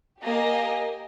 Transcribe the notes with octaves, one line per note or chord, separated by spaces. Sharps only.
A#3 G4 D#5 G#5